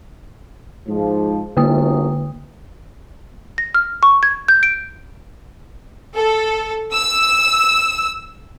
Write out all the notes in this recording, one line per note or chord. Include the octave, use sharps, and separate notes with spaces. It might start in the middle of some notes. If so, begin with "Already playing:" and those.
G#2 F3
G1 F#2 D3 A#3 D#6
A#6
F6
C#6
G#6
G6
D7
A4
E6